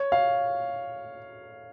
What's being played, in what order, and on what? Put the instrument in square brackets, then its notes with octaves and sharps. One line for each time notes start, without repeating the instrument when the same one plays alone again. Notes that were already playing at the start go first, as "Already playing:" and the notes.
Already playing: [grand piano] C#5
F5